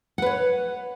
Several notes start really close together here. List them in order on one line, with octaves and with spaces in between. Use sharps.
F#5 B4 C#5